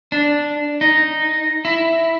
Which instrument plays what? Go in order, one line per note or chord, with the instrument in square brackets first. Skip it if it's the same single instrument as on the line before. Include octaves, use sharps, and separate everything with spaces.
[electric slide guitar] D4
D#4
E4